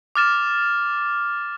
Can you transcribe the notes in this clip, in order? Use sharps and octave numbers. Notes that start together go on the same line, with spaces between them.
D6 F6 A6 E7